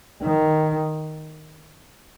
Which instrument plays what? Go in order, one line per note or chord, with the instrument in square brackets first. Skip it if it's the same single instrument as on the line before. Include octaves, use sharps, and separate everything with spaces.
[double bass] D#3